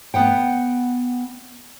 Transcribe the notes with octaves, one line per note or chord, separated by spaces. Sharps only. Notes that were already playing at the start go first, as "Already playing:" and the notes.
B3 F#5 G5